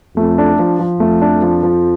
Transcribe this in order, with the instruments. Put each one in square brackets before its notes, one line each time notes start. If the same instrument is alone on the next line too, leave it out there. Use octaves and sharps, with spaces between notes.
[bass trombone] F2 [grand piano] A3
[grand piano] D4
F3
F3
[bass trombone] F2 [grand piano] A3
[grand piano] D4
F3
F3